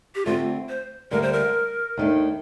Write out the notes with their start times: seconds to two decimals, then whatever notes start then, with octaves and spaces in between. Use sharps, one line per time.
0.15 G4
0.25 D3 A3 C4 F4
0.69 C5
1.11 D2 D3 G3 A#3 A#4
1.22 C5
1.33 A#4
1.97 D#2 D#3 A3 D4